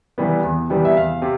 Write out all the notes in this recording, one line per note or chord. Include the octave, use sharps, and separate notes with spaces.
C3 E3 G3 B3
E2
C3 E3 G3 B3
E5
E2 F5
C3